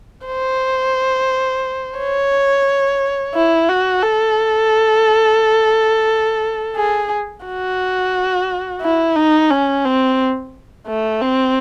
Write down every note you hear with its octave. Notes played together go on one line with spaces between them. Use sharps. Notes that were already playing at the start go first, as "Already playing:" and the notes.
C5
C#5
E4
F#4
A4
G#4
F#4
E4
D#4
C#4
C4
A3
C4